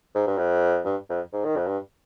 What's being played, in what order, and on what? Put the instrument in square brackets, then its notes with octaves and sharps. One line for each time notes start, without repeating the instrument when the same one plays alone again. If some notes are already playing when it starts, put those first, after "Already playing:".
[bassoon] G#2
G2
F2
G2
F2
G#2
D#3
F2
G2